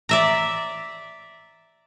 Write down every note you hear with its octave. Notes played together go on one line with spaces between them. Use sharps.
D5 E5 A#5